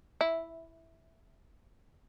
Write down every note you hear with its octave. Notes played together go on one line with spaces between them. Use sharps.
E4